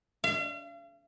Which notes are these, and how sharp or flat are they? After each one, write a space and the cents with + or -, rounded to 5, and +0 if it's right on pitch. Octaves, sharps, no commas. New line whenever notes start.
F5 -40